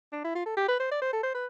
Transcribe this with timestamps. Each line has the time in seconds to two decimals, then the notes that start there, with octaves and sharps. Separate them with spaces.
0.13 D4
0.24 E4
0.35 F4
0.46 A4
0.57 G4
0.68 B4
0.80 C5
0.91 D5
1.02 C5
1.13 A4
1.23 C5
1.35 B4